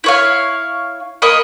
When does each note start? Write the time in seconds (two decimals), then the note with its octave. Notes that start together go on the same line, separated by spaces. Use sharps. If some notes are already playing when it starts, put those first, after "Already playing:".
0.04 E4 C#5 F5
1.22 A#3 D#5 B5 C#6